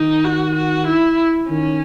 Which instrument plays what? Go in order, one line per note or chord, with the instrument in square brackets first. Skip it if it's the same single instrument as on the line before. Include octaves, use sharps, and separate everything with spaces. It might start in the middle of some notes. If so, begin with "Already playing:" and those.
Already playing: [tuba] D#3 [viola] D#4
[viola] F#4
F#4
E4
[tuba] D#3 [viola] C#4